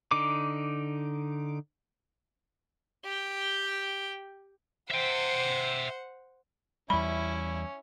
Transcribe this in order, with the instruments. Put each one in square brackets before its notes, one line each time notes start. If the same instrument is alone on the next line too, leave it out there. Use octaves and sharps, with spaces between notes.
[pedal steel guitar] D3 D#4 D6
[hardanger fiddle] G4 G5
[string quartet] C5 F#5 [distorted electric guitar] E5 G5
[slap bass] E2 G3 [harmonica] C#4 [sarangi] E4 [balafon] B5